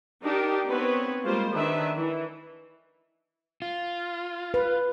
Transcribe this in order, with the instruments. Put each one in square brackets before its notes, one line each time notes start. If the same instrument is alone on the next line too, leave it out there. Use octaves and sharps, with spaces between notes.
[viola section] D4 D#4 G4 A#4
B3 C4 B4 C#5
G3 G#3 A#3 F4 C5
D#3 D4 B4 E5
E3
[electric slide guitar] F4
[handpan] B4